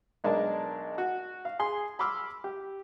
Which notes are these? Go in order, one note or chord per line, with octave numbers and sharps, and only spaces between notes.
B1 G#3 D4 A#4 A5
F#4
F5
G#4 C6
B5 C6 D6 E6 F6
G4